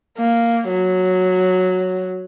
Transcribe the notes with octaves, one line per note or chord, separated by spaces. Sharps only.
A#3
F#3